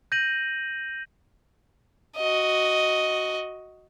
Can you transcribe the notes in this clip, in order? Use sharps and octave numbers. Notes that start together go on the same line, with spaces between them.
G6 A#6 D#7 F#7
F#4 D#5